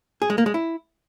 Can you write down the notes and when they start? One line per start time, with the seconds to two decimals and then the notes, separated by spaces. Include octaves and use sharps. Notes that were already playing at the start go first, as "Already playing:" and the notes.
0.22 G#4
0.30 G#3
0.38 A#3
0.46 G#3
0.54 E4